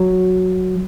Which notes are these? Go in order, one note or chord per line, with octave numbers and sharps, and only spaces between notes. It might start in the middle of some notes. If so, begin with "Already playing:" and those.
Already playing: F#3